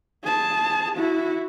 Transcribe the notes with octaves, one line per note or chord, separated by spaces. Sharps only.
G#4 A5
E4 F#4